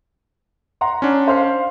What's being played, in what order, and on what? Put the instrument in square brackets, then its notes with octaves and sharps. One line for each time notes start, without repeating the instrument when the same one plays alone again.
[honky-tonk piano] F#5 A#5 C6
[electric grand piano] C#4 D4
[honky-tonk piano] C5 F5